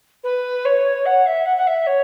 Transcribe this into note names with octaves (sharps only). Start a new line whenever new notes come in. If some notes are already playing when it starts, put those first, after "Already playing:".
B4
C#5
F#5
E5
F#5
F#5
E5
C#5